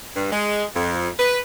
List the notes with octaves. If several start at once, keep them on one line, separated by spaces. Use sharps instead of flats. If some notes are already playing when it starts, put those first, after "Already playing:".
G2
G#3
F2
B4